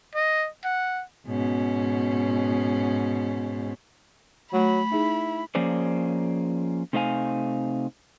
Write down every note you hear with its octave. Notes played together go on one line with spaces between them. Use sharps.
D#5
F#5
G#2 B2 C#4
F#3 A3 B5
D#4 E4 G#4
F3 A#3 C#4 G#4 C5 D5
C3 A3 D#4 C5 F5 G#5